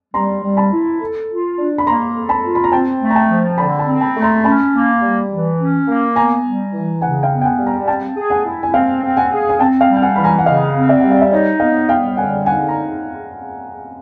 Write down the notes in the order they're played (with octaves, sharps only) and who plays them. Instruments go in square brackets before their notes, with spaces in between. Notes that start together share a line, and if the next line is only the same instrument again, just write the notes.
[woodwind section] G3 [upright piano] A#5 C6
[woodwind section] G3
[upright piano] A5 B5
[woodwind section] E4
A4
F4
D4
[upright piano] B5
[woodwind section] A#3 [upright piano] A#5 C6
[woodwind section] A4
[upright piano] A5 B5
[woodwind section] F4
[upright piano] B5
A#5
[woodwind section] C4 [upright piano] G5 A5
[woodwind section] A3
[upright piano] A#5
G5 A5
[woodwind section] F3
[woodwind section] D3 [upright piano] A5 B5
[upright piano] A5 B5
[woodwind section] C4
[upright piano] A5 B5
[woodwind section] A3
[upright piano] A#5 C6
[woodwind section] C#4 [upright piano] A5 B5
[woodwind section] A#3
G3
E3
C#4
A#3
[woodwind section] B3 [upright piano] G#5 A#5
[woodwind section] G3
E3
[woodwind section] C#3 [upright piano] F#5 G#5
[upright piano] F5 G5
[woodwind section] B3
[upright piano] G5
F#5 G#5
[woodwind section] G3
[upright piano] G#5 A#5
[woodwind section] C4 [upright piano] G5 A5
[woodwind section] G#4
[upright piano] F#5 G#5
[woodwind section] E4
[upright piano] G#5
[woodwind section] C4 [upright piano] F5 G5
[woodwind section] C4
[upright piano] F#5 G#5
[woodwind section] G#4
[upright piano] G#5
[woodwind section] C4 [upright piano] G5 A5
[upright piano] F5 G5
[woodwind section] G3
[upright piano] G5
F#5 G#5
[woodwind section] E3 [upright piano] B5
[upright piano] G#5 A#5
F#5
[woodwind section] C#3 [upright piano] D#5 F5
[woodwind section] C4
[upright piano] D5 E5
[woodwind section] G3 [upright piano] F#5
[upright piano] F5
E5
[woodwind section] D#4 [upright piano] C#5 D#5
[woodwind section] B3 [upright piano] D#5 F5
[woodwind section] G3 [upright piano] F5 G5
[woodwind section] D3 [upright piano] F#5 G#5
[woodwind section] D#4 [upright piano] F#5 G#5
[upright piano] A#5